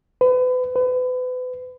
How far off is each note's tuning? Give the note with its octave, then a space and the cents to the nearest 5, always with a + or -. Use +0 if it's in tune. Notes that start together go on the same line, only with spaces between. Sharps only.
B4 +35
B4 +35